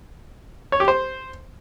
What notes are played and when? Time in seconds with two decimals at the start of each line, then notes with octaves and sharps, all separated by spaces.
0.72 C#5
0.80 G4
0.88 C5